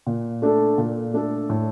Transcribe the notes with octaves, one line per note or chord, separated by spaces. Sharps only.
A#2
A3 D4 A4
A#2
A3 D4 A4
A2